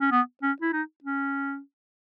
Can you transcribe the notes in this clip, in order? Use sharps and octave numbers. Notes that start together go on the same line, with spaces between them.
C#4
B3
C#4
E4
D#4
C#4